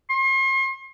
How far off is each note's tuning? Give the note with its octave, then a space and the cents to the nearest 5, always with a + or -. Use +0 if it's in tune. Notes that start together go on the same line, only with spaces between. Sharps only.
C6 +40